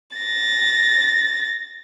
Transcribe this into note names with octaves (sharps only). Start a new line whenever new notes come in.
A6 A#6